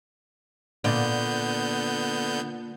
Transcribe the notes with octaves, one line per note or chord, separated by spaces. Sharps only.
A#2 D3 B3 D4 F4 G6